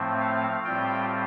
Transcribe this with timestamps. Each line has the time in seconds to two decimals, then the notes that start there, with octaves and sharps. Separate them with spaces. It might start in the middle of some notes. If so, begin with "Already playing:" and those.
Already playing: A2 F3 A3 C4
0.21 F5
0.64 A2 G3 C4 F4 G5